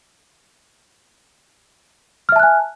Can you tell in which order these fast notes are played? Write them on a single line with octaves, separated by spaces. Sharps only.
F6 E5 A5 F#6 G#5